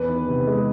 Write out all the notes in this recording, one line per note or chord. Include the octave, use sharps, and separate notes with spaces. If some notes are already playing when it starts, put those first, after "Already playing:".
Already playing: E2 B4
D#3
C3
G#3